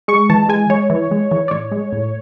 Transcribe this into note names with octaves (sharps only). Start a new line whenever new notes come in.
G#3 C#6
E3 A5
G#3 G#5
G#3 C#5
E3
G#3
E3
D5
A2 C#5
G#3
A2